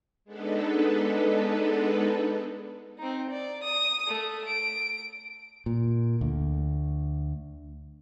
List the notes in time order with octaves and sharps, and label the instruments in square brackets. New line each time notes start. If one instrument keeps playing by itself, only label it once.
[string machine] G#3 B3 D4 D#4 A4 B4
[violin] C4 D#4
D5
D#6
A3
D7
[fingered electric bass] A#2
D2